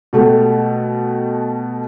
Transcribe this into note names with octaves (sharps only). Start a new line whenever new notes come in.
B2 A3 G4 A4